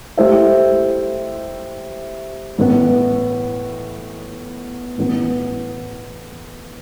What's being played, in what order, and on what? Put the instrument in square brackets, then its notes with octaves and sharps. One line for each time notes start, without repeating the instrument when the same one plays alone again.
[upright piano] A3 E4 G4 C5 E5
A2 E3 B3
A2 E3 B3